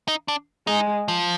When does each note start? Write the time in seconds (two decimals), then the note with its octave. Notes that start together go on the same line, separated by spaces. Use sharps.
0.08 D#4
0.28 D4
0.67 G#3 D#4
1.08 F3